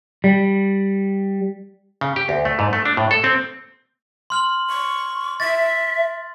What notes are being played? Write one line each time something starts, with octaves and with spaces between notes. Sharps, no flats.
G3
C#3
G4
D2
A3
G#2
A3
D4
A2
A4
C4
C6 F6 F#7
C#6
E5 A6